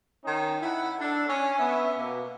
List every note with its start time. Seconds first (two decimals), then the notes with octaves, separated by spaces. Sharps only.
0.24 D#3 C#4 D#4
0.61 E4 F#5
0.99 D4 A4
1.28 C#4
1.59 B3 E5
1.97 B2 A#3